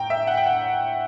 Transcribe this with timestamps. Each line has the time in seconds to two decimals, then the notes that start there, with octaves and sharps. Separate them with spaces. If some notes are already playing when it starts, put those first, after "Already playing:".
Already playing: A2 G5 A#5
0.10 E5
0.27 F#5
0.37 G5
0.46 F#5